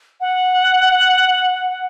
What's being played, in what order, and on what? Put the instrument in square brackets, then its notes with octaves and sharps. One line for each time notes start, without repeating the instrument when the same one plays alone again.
[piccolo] F#5